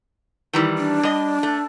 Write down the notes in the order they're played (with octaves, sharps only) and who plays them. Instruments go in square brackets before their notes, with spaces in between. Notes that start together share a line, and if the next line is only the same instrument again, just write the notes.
[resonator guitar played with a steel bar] D#3 E3 G3
[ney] D4
[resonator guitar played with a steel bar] G3 D#5
A3